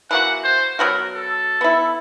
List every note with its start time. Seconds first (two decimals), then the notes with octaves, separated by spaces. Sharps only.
0.11 E3 A#3 F#4 F#5
0.44 C5
0.79 F#3 B3 F#4 A#4
1.14 A4
1.61 B3 E4